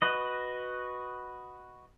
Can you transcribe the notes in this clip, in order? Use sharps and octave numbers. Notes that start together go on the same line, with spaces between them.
F#4 B4 D#5